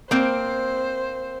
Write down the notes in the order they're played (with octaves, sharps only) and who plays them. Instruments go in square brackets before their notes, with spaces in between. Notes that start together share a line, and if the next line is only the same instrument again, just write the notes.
[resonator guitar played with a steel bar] A#3 C4 [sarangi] C5